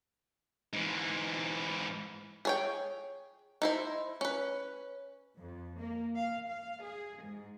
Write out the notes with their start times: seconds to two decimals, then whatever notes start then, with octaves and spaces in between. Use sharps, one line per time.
0.73 G#2 E3
2.45 G#4 C#5 G5
3.62 D#4 E4 C5
4.21 C#4 B4
5.39 F2
5.78 A#3
6.16 F5
6.50 F5
6.83 G#4
7.23 G#2